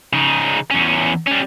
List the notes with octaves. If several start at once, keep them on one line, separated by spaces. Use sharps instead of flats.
C#3 D#4
E2 C#4
G3 C#4